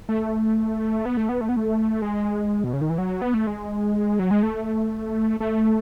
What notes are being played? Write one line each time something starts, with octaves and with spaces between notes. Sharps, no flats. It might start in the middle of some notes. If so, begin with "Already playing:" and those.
A3
B3
A3
B3
A3
B3
A3
G#3
B2
C#3
D#3
E3
F#3
B3
A3
G#3
F#3
G#3
A3
A3